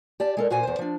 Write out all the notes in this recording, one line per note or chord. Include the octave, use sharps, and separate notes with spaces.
G4 D5 A5
G#3 A4 A#4
A#2 F#4 C5 G#5
E2 C5
F3 D4